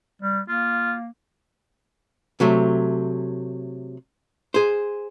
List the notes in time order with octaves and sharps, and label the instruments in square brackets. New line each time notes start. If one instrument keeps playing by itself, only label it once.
[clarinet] G3
[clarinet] A#3 [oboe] F4
[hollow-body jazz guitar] C3 F#3 A3
G#4 C5